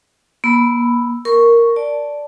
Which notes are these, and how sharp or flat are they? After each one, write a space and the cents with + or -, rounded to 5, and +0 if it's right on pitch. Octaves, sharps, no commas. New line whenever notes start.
A#3 +35 B5 +5 E6 +0
A#4 +0 C#6 +0
D5 -5 A5 +0